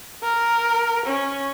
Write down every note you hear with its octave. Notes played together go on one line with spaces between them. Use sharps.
A#4
C#4